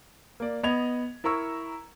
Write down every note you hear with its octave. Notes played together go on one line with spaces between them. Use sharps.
A#3 D5
B3 D#5 B5 G#6 F7
E4 A#4 A#5 C#6 E6